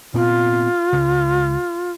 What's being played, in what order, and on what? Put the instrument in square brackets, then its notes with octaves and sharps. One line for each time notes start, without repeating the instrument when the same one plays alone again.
[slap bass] A#2 B3 C4 [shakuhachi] F4
[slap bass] C#2 C#3